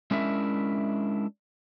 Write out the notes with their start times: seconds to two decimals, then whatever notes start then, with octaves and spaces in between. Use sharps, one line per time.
0.11 G#3 C#4 D4 E4 A#4 E5